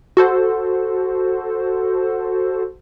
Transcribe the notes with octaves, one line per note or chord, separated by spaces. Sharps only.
F#4 A4 C5